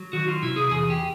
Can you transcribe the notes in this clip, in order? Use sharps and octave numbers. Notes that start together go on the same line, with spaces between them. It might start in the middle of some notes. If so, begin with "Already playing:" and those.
Already playing: F#3
D#3 F#4
F4
C3 E4
G#4
E2 G#4
G4